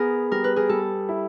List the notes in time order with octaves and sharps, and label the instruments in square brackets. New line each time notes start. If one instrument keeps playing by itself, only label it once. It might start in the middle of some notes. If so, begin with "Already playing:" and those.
Already playing: [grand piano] B3 [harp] G#4 A#4
[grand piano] G3 [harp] A#4
[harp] B4
G#4 A#4
[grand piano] G3 [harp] A4
[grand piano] E4